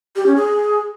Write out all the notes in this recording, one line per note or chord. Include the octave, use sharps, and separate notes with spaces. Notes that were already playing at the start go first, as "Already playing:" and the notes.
G4
C#4
G#4